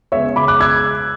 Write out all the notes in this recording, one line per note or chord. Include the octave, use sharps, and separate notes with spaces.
C#3 G#3 B3 C#5 E5
B5 D6
D6 F#6
E6 G#6